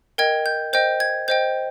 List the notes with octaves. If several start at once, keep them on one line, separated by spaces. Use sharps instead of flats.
A#4 D#5 G5 G#6
G6
C5 D#5 G5 G6
G#6
C5 D#5 G5 G6